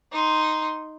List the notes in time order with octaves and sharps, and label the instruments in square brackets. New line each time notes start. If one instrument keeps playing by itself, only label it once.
[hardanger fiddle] D#4 C6